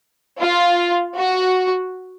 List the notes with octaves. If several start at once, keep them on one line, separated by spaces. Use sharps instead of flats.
F4
F#4